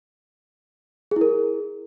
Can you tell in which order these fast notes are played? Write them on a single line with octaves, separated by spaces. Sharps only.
G#4 E4 A#4